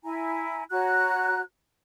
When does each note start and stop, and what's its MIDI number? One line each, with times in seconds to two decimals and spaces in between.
0.04 0.63 64
0.04 0.63 80
0.04 0.63 82
0.71 1.40 66
0.71 1.40 73
0.71 1.40 82
0.71 1.40 90